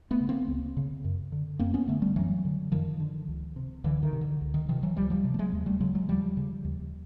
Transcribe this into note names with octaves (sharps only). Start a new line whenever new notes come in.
A3 B3
C#3
A#3 C4
C#2
C#3
F#2
D3
F#2 A#3 C4
B3 C#4
D3 A3 B3
G3 A3
F#2 E3 F#3
D3
F#2 D#3 F3
D3
C#2
C3
C#2 D3 E3
D#3
C3
D3
C#2
D#3
C3 D#3 F3
E3 F#3
C#2 F3 G3
F3 G3
C3
A3
F#3 G#3
D#2
G3 A3
C#3 F#3 G#3
F#3 G#3
D#2 F3 G3
C#3
D#2